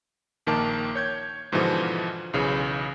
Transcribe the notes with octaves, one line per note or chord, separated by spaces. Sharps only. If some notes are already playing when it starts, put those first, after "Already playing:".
A#1 D#3 A#3 A5 D6
C#5 G6 G#6
G#2 B2 D3 E3 F3
B1 C#3 E3